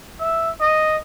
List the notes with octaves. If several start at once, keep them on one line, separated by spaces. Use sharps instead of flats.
E5
D#5